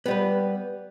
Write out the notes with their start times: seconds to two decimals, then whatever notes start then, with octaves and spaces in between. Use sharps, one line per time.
0.06 B3
0.08 G3
0.11 B4